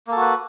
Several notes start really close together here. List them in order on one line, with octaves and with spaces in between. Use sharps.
A#3 A4 F#4 B4